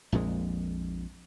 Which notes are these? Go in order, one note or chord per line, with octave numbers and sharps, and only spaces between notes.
A#1 F2 A#2 G#3